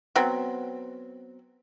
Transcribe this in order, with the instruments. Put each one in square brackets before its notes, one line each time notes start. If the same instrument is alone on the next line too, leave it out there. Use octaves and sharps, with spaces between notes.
[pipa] F#3 B3 C4